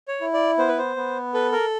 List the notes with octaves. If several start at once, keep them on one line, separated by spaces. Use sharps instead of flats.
C#5
E4
D5
B3 C5
B4
C5
B3
A4 B4
A#4